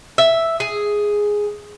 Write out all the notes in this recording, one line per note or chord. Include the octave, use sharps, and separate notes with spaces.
E5
G#4